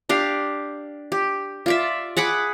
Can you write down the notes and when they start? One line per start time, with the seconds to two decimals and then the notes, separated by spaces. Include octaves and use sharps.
0.09 D4 G4 F5
1.12 G4
1.66 F4 D5 E5
2.17 G#4 F#5 B5 D6